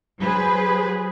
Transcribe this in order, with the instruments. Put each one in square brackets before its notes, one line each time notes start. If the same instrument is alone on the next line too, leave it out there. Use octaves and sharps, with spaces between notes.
[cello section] F#3 G#4 B4 C5